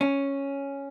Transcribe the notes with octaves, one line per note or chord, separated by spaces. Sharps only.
C#4